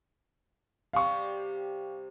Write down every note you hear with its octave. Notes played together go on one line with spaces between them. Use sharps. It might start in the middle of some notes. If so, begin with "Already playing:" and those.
C3 G3 F5 C#6